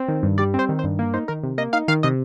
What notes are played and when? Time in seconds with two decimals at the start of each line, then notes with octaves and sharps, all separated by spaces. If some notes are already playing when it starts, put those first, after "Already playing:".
Already playing: C4
0.08 D#3
0.23 G2
0.38 G3 D5
0.54 C4
0.59 C5
0.69 D#3
0.79 C5
0.84 G2
0.99 A#3
1.14 D#4 C5
1.28 D#3 A#4
1.43 C3
1.58 A#3 D#5
1.73 D#4 F5
1.88 D#3 F5
2.03 C3 D#5